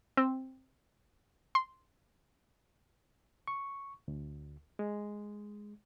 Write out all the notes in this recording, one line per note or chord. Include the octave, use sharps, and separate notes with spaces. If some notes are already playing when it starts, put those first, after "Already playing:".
C4
C6
C#6
D2
G#3